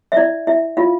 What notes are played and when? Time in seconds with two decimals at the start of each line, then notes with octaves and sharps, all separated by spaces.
0.12 E5
0.16 E4 D5
0.47 E4 E5
0.77 E4 F4 F5